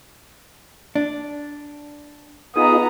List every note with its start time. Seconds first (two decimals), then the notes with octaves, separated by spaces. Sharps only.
0.95 D4
2.56 B3 D#4 F4 G#4 A#5 D#6